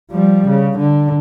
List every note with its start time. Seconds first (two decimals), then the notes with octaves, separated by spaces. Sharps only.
0.11 F3 G3
0.48 C#3
0.78 D3